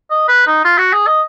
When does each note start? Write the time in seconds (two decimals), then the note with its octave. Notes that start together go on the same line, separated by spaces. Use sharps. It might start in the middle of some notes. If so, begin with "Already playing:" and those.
0.10 D#5
0.28 B4
0.47 D#4
0.65 F4
0.78 F#4
0.93 G#4
1.07 D#5